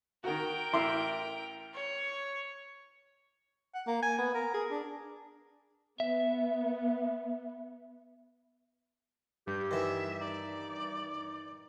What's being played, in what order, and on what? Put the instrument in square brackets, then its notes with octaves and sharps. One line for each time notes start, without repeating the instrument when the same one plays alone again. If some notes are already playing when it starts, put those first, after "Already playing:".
[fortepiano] D#3 F#4 [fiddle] A#4 G5
[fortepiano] A1 E4 C6
[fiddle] C#5
[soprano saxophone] F#5
A#3
G#5
B3
A#4
G#4
D4
[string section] B3 [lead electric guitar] E5
[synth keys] G2 [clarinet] G4 [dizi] G6
[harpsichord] D#3 E3 [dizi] E5
[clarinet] D#4 [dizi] D5